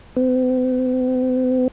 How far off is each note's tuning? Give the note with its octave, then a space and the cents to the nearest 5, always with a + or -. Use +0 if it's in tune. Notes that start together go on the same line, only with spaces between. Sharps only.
C4 -45